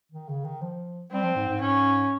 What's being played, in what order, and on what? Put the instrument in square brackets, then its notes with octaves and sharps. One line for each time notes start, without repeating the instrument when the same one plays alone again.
[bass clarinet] D#3
C#3
D#3
F3
[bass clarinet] G3 [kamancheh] C4
[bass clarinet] F3
G#2
G#2
[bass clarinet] G#2 [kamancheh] C#4